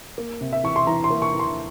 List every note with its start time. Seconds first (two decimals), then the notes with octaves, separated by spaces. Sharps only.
0.18 A#3
0.41 C3
0.53 E5
0.64 E3 C#6
0.76 C6
0.87 E3 A#5
1.04 C6
1.10 A#3
1.22 C#6
1.34 E3
1.40 C6